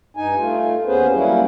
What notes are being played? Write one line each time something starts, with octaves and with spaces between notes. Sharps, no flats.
G2 D#4 G#5
A3 F4
D#2 B3 C#4 G#4 B4 C5
F#3 G3 A#3 C#4 E4